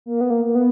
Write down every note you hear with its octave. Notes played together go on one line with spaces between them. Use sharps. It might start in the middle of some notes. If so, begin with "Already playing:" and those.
A#3
B3
A#3
A#3
B3